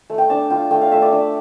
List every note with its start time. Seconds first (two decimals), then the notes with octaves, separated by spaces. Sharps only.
0.10 A3
0.18 G5
0.30 D4 A5
0.50 F4 G5
0.71 A3 G5
0.82 F5
0.92 A3 E5
1.02 D5
1.12 D4